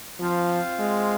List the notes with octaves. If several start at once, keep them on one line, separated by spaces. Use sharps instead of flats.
F3 C4 F4 C5 F5
G#3